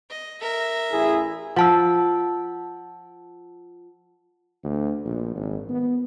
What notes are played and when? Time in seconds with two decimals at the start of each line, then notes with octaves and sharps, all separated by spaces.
0.10 D#5
0.41 A#4 E5
0.92 A1 E4 G#4
1.56 F3 F#5 A5 E6
4.64 D2
5.05 A#1
5.35 G#1
5.69 B3